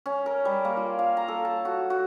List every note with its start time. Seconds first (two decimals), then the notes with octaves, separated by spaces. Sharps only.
0.06 C#4
0.26 A#4
0.45 G3
0.65 A#3
0.77 F4
0.99 F5
1.17 A#5
1.28 A4
1.45 A5
1.65 F#4
1.90 F#4